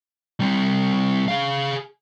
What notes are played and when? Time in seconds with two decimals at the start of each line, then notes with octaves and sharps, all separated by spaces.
0.41 G3 C4
1.28 G#4 F5